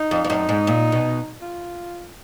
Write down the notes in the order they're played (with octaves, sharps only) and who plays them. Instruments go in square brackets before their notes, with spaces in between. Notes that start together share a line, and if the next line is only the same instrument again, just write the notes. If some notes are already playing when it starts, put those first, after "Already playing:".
Already playing: [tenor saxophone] D#4
[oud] F2
F2
[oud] F#2 [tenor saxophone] D#4
[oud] G#2
A#2
B2
[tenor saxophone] F4